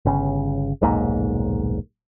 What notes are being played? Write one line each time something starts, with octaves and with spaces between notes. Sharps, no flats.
G1 C#3
D#1 B1 G#2 A#3